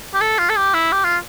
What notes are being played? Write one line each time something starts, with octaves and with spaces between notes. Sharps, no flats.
G4
A4
F4
A4
G4
E4
G4
F4